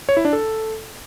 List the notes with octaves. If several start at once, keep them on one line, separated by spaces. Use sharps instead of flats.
C#5
E4
D4
A4